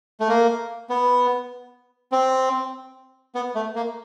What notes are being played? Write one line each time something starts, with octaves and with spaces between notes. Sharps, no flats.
A3
A#3
B3
C4
B3
A3
A#3